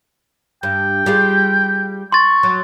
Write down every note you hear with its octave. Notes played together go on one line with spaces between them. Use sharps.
G2 G5
G3 F4 G#4
C6 C#6 A6
F#3